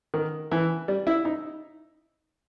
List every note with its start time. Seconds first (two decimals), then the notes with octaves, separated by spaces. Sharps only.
0.14 D#3
0.52 E3
0.88 G3
1.07 E4
1.25 D#4